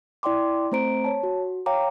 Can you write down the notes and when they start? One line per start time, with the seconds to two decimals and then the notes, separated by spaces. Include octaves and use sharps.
0.23 E4 D5 G5 C6 D6
0.72 A3 C4 C5 A#5 D7
1.04 C#5 A5
1.23 F#4
1.66 C#5 F5 G5 A#5 D6